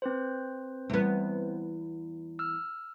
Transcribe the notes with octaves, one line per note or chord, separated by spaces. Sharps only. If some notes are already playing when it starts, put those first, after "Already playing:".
C4 B4 C5
E2 G3 B3 E4
E6 F6